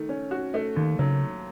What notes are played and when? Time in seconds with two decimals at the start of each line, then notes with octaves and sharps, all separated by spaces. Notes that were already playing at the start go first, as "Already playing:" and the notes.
Already playing: D#3 A3
0.09 C#4
0.31 F#4
0.54 A3
0.76 D#2 D#3
0.99 C#3 F#3